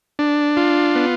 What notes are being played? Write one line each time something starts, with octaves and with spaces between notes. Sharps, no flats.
D4
F4
B3